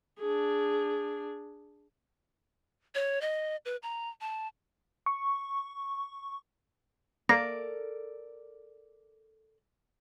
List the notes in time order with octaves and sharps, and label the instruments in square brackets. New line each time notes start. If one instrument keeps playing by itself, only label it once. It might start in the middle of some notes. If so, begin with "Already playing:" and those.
[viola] D4 G#4
[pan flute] C#5
D#5
B4
A#5
A5
[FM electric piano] C#6
[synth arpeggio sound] A#3 [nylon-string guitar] A4 A#4 D5 [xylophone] A#6